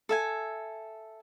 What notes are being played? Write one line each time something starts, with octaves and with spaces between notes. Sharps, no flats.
A4 E5 G#5